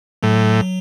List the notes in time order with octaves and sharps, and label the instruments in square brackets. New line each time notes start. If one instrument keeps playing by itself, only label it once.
[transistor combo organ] A2 [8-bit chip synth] F#3